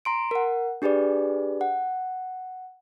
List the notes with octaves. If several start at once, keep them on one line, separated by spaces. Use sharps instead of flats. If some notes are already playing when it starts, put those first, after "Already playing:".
A#5 C6 D7
A#4 F#5
D4 G4 G#4 B4 D5
F#5